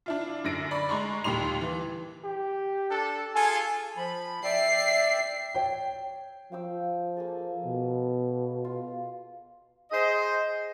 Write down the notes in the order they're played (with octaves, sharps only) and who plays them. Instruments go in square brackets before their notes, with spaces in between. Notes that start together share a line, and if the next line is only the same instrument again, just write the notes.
[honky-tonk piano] D4 E4 F4
F#2 D3 A#6 D7
D5 B5 C#6
G#3 A#5 C6 C#6
D#2 A#2 G3 C6 F7
E3
[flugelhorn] G4
[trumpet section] D4 A4
[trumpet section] F4 G#4 A4 [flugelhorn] G#5
[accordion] F3 B5
[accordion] D5 E5 G5 [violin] C7
[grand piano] C#5 G5
[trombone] F3 [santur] F5 G5 E6
[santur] A#3 G#4 A4
[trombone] B2
[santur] F4
[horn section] G#4 C5 D#5